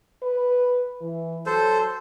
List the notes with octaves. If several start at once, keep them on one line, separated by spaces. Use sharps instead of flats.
B4
E3
F#3 A4 C5